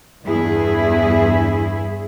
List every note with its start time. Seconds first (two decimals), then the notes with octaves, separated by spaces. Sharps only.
0.23 E2 G2 E4 G#4